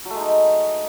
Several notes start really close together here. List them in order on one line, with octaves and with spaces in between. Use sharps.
F#3 A3 G#3 D#4